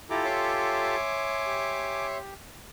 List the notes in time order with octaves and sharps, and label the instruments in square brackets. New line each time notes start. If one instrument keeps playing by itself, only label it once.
[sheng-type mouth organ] E4 A#5 [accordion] F4 G4 A4 [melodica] G#5 D6
[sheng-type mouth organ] C#5 E5 C6
[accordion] G4